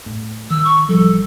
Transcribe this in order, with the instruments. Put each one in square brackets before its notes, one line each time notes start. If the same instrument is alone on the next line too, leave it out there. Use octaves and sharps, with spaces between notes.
[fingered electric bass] A2
[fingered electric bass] D#3 [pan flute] E6
[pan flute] C#6
[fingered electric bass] A1 F3 G3 [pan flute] A4